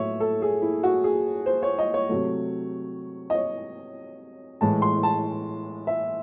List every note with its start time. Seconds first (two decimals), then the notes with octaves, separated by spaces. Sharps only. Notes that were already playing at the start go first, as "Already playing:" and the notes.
Already playing: A2 F#3 A3 C#5 E5
0.20 A4
0.42 G#4
0.62 E4
0.83 F#4
1.04 G#4
1.46 C5
1.63 C#5
1.78 D#5
1.94 C#5
2.09 C3 F#3 A3
3.30 D#5
3.35 C#5
4.61 A2 E3 G#3 A5
4.82 C6
5.03 A5
5.87 E5